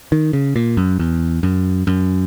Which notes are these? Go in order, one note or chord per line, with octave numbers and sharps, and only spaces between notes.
D#3
C#3
A#2
F#2
E2
F#2
F#2